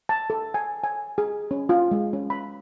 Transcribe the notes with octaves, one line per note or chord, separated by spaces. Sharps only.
A5
A4
G#5
G#5
G#4
C#4
F4
G#3
C#4
B5